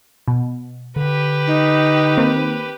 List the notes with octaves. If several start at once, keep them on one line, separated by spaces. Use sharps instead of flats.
B2
D3 G4 B4
D#4
D#3 A#3 C4